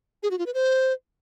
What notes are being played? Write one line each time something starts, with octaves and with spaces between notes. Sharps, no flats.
G#4
F#4
F4
B4
C5